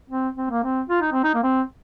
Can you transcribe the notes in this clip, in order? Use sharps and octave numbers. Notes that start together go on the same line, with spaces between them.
C4
C4
A#3
C4
F4
D#4
C4
D#4
A#3
C4